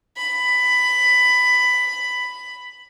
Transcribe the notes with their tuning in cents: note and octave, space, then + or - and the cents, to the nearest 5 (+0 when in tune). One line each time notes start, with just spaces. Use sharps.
B5 +10